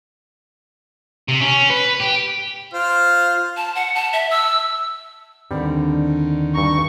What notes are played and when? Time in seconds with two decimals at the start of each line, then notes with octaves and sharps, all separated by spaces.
1.28 C3
1.41 C#4
1.70 B4
2.00 G4
2.74 F4 C5 F6
3.57 A5
3.75 F#5
3.95 A5
4.13 E5
4.31 E6
5.51 D#2 D3 D#3 G3 C4 D4
6.55 G2 A#5 C#6